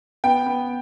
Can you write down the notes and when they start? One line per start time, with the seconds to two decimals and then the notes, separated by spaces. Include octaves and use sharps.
0.24 B3 G5
0.46 B3